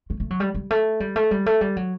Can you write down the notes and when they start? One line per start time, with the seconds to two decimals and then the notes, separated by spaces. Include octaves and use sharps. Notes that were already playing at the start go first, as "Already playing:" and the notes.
0.10 A3
0.20 A3
0.30 F#3
0.40 G3
0.55 G3
0.70 A3
1.00 G3
1.16 A3
1.31 G3
1.46 A3
1.61 G3
1.77 F#3